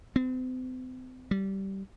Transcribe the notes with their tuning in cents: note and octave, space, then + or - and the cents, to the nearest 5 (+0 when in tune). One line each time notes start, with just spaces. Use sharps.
C4 -40
G3 -15